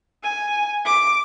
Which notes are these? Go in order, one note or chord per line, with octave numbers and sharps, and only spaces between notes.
G#5
D6